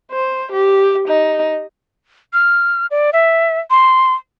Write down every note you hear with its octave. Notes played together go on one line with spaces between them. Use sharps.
C5
G4
D#4
F6
D5
E5
C6